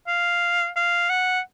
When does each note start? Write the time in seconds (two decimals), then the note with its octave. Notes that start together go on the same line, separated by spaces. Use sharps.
0.08 F5
0.76 F5
1.10 F#5